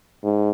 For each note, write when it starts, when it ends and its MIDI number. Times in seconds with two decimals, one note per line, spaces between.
0.23 0.51 44